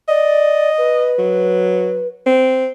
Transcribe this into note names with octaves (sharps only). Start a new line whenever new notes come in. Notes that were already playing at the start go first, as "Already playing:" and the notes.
D5 D#5
B4
F#3
C4